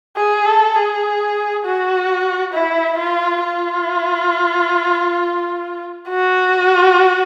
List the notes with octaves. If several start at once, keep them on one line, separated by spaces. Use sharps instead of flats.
G#4
A4
G#4
F#4
E4
F4
F4
F#4